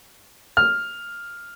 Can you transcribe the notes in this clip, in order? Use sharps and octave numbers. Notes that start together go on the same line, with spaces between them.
F6